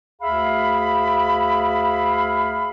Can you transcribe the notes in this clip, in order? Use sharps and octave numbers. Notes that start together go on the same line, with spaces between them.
D2 G#4 E5 F5 B5